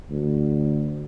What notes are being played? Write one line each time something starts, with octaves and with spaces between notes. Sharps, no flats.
D2